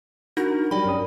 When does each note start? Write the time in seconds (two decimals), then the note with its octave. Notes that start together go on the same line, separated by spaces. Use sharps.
0.37 D4 D#4 F#4 A#4
0.71 F#3 G3 D5 G5 B5
0.85 G2 C#4 D#6